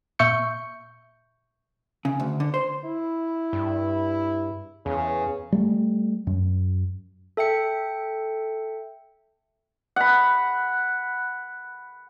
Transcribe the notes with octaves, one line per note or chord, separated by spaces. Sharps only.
A#2 E5 C#6 G6 C#7
C#3
D2
D3
C5
E4
G2
E2 C#3
G3 A3
F#2
A4 E5 G5 C#7
F#5 B5